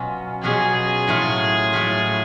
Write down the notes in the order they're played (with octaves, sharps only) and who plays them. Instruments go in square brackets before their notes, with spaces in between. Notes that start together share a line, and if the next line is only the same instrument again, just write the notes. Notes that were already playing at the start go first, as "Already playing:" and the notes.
Already playing: [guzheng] B2 F#3 C#4 F4
[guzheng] B2 F#3 C#4 F4 [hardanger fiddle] G#4
[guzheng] A2 F#3 A3 F4
A2 F#3 A3 F4